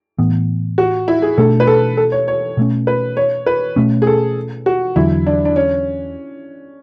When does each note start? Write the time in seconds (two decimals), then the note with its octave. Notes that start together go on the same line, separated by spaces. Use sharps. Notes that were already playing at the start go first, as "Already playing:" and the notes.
0.18 A2 E3 B3
0.78 F#4
1.08 E4
1.22 G#4
1.38 B2 A3 D4 A4
1.60 B4
1.67 A4
1.97 A4
2.12 C#5
2.28 C#5
2.57 B2 A3 C#4
2.87 B4
3.17 C#5
3.46 B4
3.76 B2 A3 C#4
4.02 G#4
4.07 A4
4.66 F#4
4.96 E2 D3 F#3 E4
5.26 D4
5.45 D4
5.56 C#4